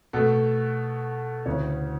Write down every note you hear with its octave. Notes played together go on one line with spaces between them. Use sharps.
B2 A3 A4
D2 C#3 E3 C#5